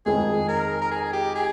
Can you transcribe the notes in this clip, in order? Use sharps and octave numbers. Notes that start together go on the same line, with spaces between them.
F2 D#3 G#3 G#4
A#4
A#4
G#4
G4
G#4